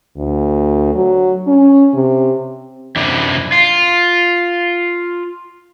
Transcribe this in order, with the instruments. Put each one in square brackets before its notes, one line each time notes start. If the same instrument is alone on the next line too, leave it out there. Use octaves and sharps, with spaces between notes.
[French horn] D2
F#3
C#4
C3
[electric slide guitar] F#2 C3 D4 E4
F4